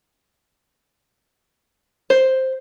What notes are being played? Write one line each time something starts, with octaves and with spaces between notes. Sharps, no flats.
C5